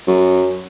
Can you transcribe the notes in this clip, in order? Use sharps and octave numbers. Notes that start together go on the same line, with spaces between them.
F#2